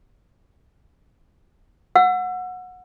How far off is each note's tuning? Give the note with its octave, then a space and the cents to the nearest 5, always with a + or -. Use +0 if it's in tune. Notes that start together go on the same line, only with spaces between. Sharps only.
F#5 -20 E6 +30